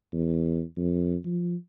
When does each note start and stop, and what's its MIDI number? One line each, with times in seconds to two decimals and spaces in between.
0.13 0.62 40
0.77 1.16 41
1.25 1.55 53